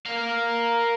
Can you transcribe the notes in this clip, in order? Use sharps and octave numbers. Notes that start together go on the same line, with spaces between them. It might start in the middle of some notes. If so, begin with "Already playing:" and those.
A#4 F5